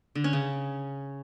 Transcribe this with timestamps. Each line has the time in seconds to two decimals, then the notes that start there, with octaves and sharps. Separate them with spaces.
0.15 D3
0.24 C#4
0.33 C#3